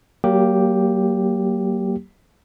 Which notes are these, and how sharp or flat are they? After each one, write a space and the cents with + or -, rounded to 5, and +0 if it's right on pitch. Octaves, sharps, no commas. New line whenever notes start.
F#3 +35 A#3 +0 G4 +0